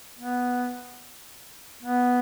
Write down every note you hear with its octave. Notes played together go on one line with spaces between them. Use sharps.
B3
B3